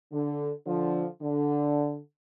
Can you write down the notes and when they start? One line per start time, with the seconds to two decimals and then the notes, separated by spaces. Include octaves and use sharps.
0.12 D3
0.66 D3 F3
1.22 D3